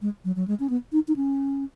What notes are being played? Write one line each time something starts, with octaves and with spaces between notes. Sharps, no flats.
G#3
F#3
F#3
G#3
C#4
B3
D#4
D#4
C#4